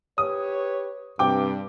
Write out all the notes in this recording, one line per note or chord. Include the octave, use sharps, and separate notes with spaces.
G4 B4 C#5 D#6
G2 C3 G5 D6